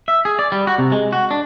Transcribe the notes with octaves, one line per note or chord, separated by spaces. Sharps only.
E5
G#4
D5
G3
F#4
C3
G#3
F#4
D4